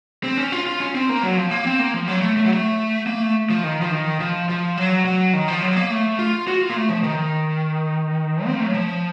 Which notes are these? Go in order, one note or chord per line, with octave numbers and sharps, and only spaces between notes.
C4
C#4
F4
F4
C#4
C4
A#3
F#3
F3
A#3
C4
A#3
F3
F#3
A3
A3
F#3
A3
A#3
A3
F3
D#3
F3
D#3
F3
F3
F#3
F#3
D#3
F3
F#3
A#3
A3
F4
F#4
F4
A#3
A3
F3
D#3
C4
A#3
A3
F#3
F3